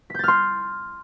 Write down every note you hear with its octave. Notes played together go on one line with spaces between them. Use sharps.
C6 F6 G6 A6 B6